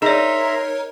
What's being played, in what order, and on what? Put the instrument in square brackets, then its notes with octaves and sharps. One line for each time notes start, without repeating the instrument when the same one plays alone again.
[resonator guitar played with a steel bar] D#4 [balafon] G#4 D5 [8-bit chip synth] A#4 C#5 [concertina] E5 A#5 C6